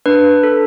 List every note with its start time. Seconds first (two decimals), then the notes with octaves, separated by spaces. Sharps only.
0.06 D4 B4
0.43 A4